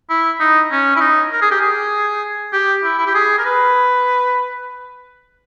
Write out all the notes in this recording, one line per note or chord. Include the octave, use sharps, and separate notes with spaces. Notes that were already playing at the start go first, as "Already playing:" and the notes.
E4
D#4
C#4
E4
D#4
A#4
G#4
G4
G#4
G4
E4
E4
G4
G#4
A#4
B4